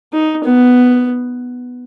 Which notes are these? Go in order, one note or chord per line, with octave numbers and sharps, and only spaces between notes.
D#4
B3